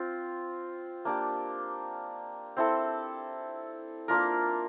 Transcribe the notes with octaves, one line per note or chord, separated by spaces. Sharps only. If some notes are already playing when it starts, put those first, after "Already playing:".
Already playing: C4 F4
A#3 D4 G4
C4 E4 A4
A#3 D4 F4 A#4